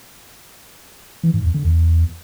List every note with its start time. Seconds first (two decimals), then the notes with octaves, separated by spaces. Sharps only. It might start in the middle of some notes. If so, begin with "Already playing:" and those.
1.23 E3
1.34 G#2
1.44 E2
1.54 D3
1.65 E2